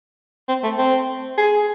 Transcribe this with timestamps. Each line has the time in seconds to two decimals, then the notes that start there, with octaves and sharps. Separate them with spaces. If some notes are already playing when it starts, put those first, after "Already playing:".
0.49 C4
0.63 A3
0.78 C4
1.38 G#4